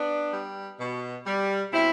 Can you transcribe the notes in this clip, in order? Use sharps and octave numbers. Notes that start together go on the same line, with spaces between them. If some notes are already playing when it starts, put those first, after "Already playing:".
Already playing: B3 D4
G3
B2
G3
B2 C4 E4